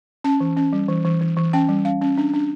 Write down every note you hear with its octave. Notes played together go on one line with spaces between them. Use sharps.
C#4 A5
E3
C#4
G3
E3
E3
E3
E3
C#4 G5
G3
C#4 F5
C#4
D4
D4